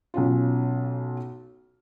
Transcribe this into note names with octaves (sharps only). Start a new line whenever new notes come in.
B1 C#4 F4